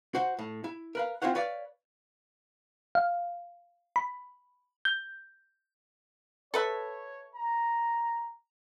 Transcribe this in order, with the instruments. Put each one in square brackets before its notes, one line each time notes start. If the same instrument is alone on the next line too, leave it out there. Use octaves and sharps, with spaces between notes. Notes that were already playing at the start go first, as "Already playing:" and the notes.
[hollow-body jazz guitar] F#4 C5 F#5
A2
E4
A#4 B4 F5
C4 E4 F4 C5 C#5 F#5
B4 C#5 D5 F5
[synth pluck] F5
B5
G6
[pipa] A4 B4 E5 [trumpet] C#5
[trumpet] A#5